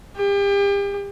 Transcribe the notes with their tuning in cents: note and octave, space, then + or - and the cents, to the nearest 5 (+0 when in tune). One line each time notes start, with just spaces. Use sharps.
G4 +35